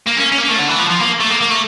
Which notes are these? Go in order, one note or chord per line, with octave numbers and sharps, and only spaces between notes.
A#3
C#4
C#4
A#3
A3
D3
E3
F3
F3
A#3
A3
A#3
A#3
A3